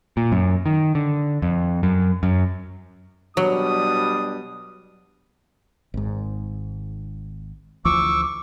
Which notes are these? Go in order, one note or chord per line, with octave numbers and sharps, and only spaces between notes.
A#2
F#2
D#3
D3
F2
F#2
F#2
B2 F#3 G3 D4 D#6
G#1 G#2
D2 E3 F3 C#6 D6 E6